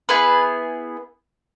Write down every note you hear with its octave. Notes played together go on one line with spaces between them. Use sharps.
B3 E4 G#4 B4